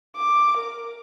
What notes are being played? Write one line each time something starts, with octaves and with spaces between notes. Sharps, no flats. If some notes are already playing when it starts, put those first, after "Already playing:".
D6
A#4